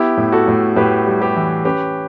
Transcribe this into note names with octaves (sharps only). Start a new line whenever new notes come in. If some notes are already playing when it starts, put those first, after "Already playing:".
Already playing: B3 E4 G4
A2
F#4 A4
A2
A2 G4 B4
G3
G4 B4
E3
C#4 G4 B4